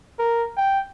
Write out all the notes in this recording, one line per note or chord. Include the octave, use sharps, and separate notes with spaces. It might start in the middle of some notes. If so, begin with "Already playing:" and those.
A#4
G5